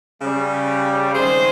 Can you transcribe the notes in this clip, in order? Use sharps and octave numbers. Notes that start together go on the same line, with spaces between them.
C#3 G3
C3 D#3 G#3 G#4 C5